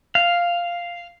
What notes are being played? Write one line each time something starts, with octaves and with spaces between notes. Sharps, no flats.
F5